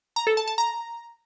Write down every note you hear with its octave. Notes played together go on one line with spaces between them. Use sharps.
A#5
A4
A5
A5
A#5